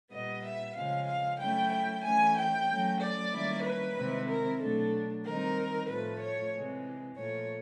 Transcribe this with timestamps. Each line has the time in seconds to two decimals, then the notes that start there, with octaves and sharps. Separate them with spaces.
0.11 A#2 G3 B3 D#5
0.44 E5
0.75 C#3 F3 G#3 F5
1.07 F5
1.39 F#3 A3 C#4 E4 G5
1.72 G5
2.03 E3 A3 C#4 E4 G#5
2.36 G5
2.68 F#3 A3 C#4
3.00 D5
3.32 D#3 G3 A#3 C#4 E4
3.63 B4
3.96 C3 D#3 G#3 C4 E4
4.29 A#4
4.60 B2 F#3 A3 D4 A4
5.25 D#3 G3 C4 D#4 A#4
5.88 A2 F3 A3 B4
6.20 C#5
6.53 C3 E3 G#3
7.16 A#2 F3 A3 C#5